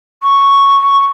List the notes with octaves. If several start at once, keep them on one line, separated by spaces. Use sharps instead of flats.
C#6